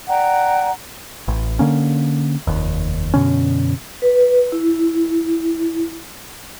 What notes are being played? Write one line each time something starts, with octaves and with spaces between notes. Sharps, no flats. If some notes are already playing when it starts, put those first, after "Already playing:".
D5 F#5 G5 A#5
A1
D3 A#3 C#4
F1 D#2
F#2 B2 D3 C#4
B4
E4